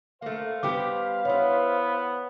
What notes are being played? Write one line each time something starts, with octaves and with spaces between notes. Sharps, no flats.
A3 A#3 C5 F5
G3 B3 G4 D6
B3 E4 B4 C#5